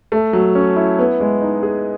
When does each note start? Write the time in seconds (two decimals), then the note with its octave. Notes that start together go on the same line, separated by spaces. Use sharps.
0.12 A3
0.33 F#3
0.55 C#4
0.76 E4
0.99 B3
1.20 G#3
1.42 D#4
1.63 G#4